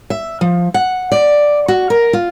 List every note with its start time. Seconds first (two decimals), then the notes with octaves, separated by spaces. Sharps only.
0.10 E5
0.41 F3
0.74 F#5
1.12 D5
1.68 F#4
1.90 A#4
2.13 F4